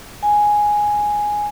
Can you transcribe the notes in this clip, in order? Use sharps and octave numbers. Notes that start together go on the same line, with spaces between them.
G#5